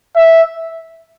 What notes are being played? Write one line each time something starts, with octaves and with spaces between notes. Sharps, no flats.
E5